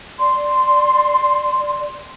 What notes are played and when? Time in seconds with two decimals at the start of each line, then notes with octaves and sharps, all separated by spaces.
0.19 D5 C6